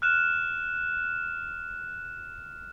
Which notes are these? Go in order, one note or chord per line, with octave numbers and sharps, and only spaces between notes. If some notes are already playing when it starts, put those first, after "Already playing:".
F6 F#6 E7